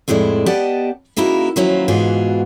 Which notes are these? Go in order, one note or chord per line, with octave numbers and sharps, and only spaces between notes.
F2 A2 G#3 E4 D5
B3 G4 D5 D#5 F#5 A5
C#3 A#3 D#4 E4 F#4 A#4
D#3 F3 F#3 A#3 C#4 E4
G#2 B2 E3 F4 F#4 G#4